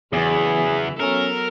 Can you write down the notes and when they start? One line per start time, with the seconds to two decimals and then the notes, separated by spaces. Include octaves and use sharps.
0.13 E2 C#3 E3 F#3 G#4
1.00 F#3 B3 C#4 A4 A#4